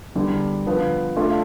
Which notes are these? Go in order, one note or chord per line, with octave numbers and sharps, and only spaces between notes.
E2 D3 G3 D4
D3 F3 B3
A3 D4 F4 A4